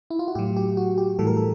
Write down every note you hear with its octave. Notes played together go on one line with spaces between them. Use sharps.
E4
F4
F#4
A2 F#3 G4
G4
F#4
G4
A2 E3 G3 A4
A#4
A4